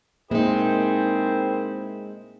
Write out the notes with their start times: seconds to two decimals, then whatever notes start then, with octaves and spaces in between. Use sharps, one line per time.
0.31 G#3 A#3 C4 D#4 E4 G#4 A#4